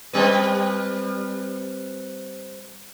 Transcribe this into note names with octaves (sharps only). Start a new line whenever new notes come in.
G3 C4 B4